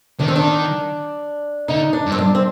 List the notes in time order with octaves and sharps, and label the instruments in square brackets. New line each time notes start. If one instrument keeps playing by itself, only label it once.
[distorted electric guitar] D#3 [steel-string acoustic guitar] D4
[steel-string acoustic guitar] C4
D4
[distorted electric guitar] D3 [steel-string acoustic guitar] D#4
[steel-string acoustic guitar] D4
[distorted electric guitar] G2
[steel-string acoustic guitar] C4
D4
C4